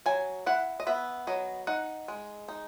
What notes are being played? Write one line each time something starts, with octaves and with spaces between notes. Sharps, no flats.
F#3 G#5
E4 F#5
D#5
B3 E5
F#3 D#5
D#4 F#5
G#3
D#4